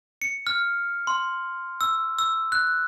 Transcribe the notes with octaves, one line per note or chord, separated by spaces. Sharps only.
C#7
F6
C6
E6
E6
F#6